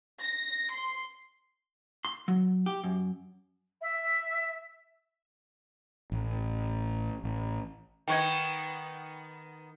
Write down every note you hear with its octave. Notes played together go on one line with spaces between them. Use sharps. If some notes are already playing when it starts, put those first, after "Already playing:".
A#6
C6
C6
F#3
G4
F#2
E5
A1
A1
D#3 B3 D#4 G5 C#6 G#6